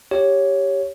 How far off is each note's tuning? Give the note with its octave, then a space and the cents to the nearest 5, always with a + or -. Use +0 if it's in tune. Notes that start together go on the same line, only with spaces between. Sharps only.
G4 +0 C#5 +0